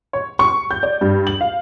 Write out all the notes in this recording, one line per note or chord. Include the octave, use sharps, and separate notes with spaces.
C#5
C#6
G6
D5
G2
F#7
F5